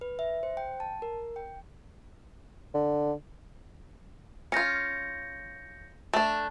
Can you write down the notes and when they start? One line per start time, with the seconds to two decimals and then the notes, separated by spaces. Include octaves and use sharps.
0.01 B4
0.19 E5
0.43 C5
0.57 G5
0.80 A5
1.02 A#4
1.36 G5
2.74 D3
4.52 C#4 F4 G6 A#6 C#7
6.13 A3 D4